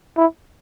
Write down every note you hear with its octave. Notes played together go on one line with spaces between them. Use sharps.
E4